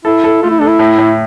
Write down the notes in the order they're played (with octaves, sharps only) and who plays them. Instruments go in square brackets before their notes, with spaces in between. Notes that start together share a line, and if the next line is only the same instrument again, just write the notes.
[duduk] E4 [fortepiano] A4
[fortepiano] A4
[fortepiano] A3 [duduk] F4
[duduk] E4
[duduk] D4 [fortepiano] A4
[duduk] E4
[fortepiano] A2
A2